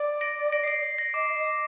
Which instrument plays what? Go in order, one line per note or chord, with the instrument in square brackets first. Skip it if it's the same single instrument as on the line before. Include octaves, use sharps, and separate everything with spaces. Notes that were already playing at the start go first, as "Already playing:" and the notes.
Already playing: [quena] D5
[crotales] A#6 D7
A#6 D7
C7
A#6 D7
C7
A#6
[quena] D#5 [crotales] D6
[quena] D#5